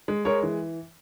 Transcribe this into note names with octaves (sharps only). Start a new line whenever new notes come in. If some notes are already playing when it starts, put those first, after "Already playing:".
G#3
G#3 A#4 C#5
E3